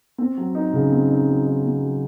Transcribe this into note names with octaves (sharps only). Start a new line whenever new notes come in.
C4
F#3
D#4
C#3
C4
D#4
F#3
D#4
C4
F#3